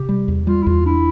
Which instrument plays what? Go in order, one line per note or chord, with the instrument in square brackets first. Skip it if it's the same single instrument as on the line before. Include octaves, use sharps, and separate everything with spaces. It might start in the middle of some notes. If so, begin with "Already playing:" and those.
Already playing: [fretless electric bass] C3 [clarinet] G4
[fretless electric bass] G3
E2
[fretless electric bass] G3 [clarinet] F4
[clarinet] E4
[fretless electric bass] E2 [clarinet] F4
[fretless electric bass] D4 [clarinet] E4